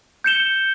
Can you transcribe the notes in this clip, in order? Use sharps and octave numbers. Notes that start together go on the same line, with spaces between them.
G6 C#7 E7 G7